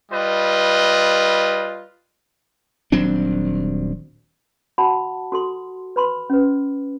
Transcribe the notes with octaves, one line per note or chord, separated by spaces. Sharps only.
G3 F4 B4 D#5
D#1 F#3 C4 D4
F#4 F#5 A5 B5
F#4 A4 C6
B4 B5 C6
C#4 B4